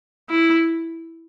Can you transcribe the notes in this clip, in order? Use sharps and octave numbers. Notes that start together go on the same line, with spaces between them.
E4